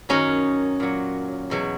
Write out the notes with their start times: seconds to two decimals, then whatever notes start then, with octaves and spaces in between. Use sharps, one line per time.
0.09 F#2 D#3 F#3 C#4 D#4
0.80 A#2 F#3
1.50 E2 B2 F#3